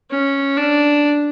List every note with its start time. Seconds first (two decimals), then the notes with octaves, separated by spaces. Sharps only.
0.11 C#4
0.57 D4